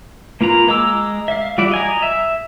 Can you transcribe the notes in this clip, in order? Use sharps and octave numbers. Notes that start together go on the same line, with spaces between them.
A#3 F4 B4 A#5
G#3 A#5 D6 E6
E5 F5
G3 F4 F#4 D5 E5
D#5 G#5 A#5
E5